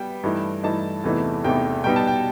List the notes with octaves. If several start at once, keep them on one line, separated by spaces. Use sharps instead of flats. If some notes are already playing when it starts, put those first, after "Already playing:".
Already playing: G3 B3 G5
G2 E3 A3 D#4
G2 E3 A3 D#4 A5
E2 C3 E3 A3 D#4
E2 C3 E3 A3 D#4 G5
B2 G3 B3 D#4 G5
A5
G5